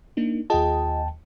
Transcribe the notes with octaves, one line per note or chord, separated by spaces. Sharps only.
A#3 D4 D#4
D#2 F4 G#4 D#5 G5 A5